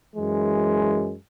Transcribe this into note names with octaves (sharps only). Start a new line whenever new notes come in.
F#2 E3 G#3